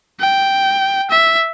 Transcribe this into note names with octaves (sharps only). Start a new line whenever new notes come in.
G5
E5